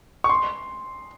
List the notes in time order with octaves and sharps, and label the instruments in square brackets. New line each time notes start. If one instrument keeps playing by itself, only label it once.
[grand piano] C#6
C6